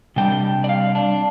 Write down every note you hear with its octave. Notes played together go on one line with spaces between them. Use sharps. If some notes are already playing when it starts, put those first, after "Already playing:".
C3 G3 D4 G5
D5
F5
D4